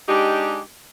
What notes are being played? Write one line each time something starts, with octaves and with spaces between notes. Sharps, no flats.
G#3 D4 D#4 G4